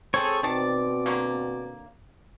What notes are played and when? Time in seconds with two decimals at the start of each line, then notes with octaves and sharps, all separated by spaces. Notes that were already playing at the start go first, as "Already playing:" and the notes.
0.14 C4 G#4 A4 C#5
0.43 B2 D#3 C4 D5 A5
1.06 D3 F#3 A#3